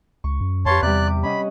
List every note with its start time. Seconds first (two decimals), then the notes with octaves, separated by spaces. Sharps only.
0.24 C#2 C#6
0.41 F#2
0.66 F2 G4 B4 C#5 F5 A5 C6
0.82 E2 C3 G3 D5 F#6
1.08 D6
1.23 C#4 D#5 F#5 B5